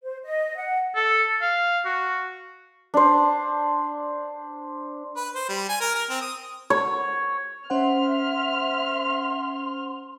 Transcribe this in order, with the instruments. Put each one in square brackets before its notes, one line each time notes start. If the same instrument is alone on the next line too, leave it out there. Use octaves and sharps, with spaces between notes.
[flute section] C5
D#5
F#5
[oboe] A4
F5
F#4
[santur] D4 C5
[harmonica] B4
C5
G3
G#5
A#4
A#4
C4
D#6
[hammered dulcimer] C#5
[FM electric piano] C#4 C5 F#5 [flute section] E5 [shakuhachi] C6 [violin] F6